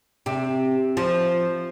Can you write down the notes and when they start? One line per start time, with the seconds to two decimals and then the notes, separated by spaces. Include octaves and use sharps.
0.26 C3
0.97 F3